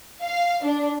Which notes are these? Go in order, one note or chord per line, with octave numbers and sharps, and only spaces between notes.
F5
D4